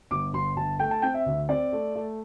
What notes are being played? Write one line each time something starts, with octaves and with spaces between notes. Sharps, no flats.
G1 D6
G1 C6
G1 A5
A3 G5
A5
C4 G5
E5
D2
C4 D5
A3
A3